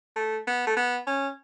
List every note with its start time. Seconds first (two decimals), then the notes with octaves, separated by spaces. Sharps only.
0.16 A3
0.47 B3
0.67 A3
0.77 B3
1.07 C#4